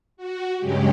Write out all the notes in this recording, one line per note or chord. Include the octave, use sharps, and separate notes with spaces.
F#4
G2 C#3 F#3 G#3 G4